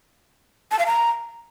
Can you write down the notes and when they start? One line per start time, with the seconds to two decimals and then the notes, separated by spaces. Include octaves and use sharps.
0.72 A5
0.79 F5
0.86 A#5